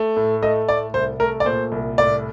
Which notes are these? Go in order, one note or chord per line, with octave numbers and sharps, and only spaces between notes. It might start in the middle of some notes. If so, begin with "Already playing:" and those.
Already playing: A3
A2
A3 D#5
A2 D5
C2 C5
A3 A#4
D5
A#2 C5
C2
A2 D5